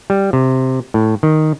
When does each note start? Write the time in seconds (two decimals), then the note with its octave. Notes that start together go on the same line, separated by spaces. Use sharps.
0.10 G3
0.33 C3
0.94 A2
1.23 D#3